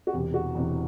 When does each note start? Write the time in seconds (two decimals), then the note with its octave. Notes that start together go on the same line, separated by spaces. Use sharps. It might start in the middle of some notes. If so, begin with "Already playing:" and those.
0.07 F#4
0.13 E1 E2 C3 E3 G4
0.34 F#4
0.55 E1 E2 C3 E3